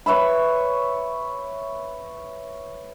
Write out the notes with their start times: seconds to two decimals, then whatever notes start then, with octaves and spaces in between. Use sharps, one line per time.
0.06 B4 C#5 E5 B5